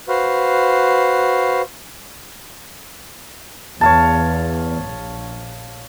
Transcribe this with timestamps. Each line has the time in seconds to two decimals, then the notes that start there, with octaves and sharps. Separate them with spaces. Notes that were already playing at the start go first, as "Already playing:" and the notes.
0.08 F#4 B4 C5 F5
3.81 E2 C#5 F5 A5
4.83 A#1